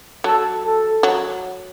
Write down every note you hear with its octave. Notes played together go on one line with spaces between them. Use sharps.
F#3 A4
A4
F#3